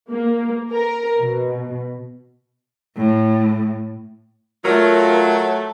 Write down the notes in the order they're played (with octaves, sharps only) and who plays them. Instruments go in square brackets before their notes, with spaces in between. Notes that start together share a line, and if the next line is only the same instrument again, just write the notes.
[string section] A#3
A#4
B2
[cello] A2
[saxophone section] F#3 [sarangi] A3 [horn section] F4 [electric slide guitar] A#4